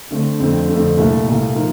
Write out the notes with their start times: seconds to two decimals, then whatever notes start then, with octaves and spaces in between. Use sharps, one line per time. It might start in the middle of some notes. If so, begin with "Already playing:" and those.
0.11 D3 A3 C4
0.40 F2 D3 A3 C4
0.68 F2 D3 A3 C4
0.98 C2 A#2 A3
1.26 C2 A#2 A3
1.55 F3 A#3 D#4